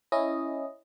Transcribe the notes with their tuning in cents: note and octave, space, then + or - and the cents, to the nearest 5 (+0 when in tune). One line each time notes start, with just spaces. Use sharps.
C#4 -5 E4 +0 D#5 +0